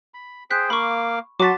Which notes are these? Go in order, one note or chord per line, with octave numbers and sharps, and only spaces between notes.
B5
G#4 C5 G5 F#6 B6
A#3 F5 B5 C#6 D6
F#3 F#4 A5 C6 D6 B6